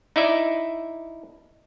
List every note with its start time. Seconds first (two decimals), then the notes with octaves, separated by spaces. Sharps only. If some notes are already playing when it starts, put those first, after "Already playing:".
0.16 D#4 E4 D5 E5